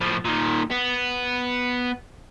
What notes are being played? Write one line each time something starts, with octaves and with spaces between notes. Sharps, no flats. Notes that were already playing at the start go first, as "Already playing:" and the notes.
A2 F3
A#2 D#3
B3